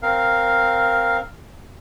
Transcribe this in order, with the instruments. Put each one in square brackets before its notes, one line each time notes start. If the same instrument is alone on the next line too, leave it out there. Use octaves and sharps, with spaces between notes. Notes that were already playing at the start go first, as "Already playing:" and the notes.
[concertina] C4 A#4 F5